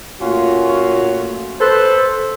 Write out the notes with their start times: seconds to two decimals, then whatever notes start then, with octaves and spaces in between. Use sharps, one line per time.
0.21 A#2 A3 C#4 F4 F#4
1.60 A4 B4 C5